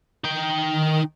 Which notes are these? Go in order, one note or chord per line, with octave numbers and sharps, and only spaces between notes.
D#4 G5
D#3